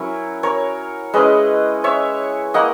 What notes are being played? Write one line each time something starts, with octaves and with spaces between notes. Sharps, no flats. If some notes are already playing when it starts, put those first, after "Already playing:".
Already playing: F#3 C#4 E4 A#4 C#5
A#4 C#5
G#3 C#4 E4 B4 D#5
C#5 E5
A#3 E4 D#5 F#5